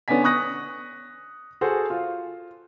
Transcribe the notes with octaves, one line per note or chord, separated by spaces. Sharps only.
D3 B3 C#4 D5 G#5 B6
C#6 D#6 F#6 A#6
F#4 G#4 A4 C5
F4